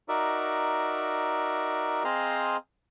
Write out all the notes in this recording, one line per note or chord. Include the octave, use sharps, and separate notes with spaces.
D#4 F#4 A#4 D5 E5
C4 G#4 C5 D#5 F5 A#5